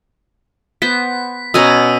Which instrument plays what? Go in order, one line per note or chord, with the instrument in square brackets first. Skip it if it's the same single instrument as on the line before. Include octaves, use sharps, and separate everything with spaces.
[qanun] B3 C5 [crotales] B6
[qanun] B2 C#4 A#5 [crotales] D#6 E6 D#7